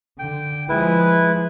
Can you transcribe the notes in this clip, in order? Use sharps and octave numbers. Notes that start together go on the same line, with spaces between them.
D3 G5
F3 G#3 E4 B4